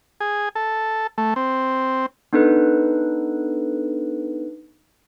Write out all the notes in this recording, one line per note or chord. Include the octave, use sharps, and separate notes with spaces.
G#4
A4
A3
C4
B3 D4 D#4 A4 B4